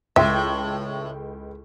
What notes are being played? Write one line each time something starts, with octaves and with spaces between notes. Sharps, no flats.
C#2 A2 E5 G5 C6